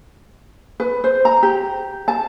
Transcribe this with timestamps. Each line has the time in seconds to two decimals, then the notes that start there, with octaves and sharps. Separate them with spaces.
0.80 B4
1.04 C5
1.25 A#5
1.43 G4
2.08 A5